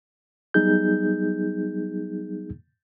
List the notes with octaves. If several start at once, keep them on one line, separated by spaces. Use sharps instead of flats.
F#3 G3 B3 D#4 G#4 G6